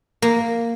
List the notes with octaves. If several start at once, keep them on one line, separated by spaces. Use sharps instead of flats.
A#3